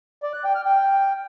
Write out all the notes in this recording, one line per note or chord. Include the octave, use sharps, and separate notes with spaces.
D5
F#6
G5
F6
G5